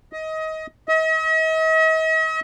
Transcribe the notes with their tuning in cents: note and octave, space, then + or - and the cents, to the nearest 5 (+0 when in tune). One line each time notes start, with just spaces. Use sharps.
D#5 +25
D#5 +45